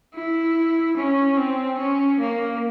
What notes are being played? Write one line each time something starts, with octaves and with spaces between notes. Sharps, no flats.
E4
C#4
C4
C#4
A#3